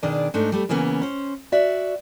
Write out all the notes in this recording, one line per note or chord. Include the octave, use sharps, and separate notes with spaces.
B2 D#3 D4 G#4 D5
G#2 A3 D4 D#4
G3 A3 G4
C#3 E3 A#3 B3 C#4
C#4 C5
F#4 D5 E5